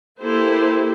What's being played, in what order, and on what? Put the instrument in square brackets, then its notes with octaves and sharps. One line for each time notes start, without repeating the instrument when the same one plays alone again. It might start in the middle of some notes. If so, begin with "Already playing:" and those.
[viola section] A#3 E4 G4 A4 C5